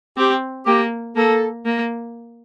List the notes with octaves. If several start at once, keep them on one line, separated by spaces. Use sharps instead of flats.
C4 G4
A#3 G4
A#3 A4
A#3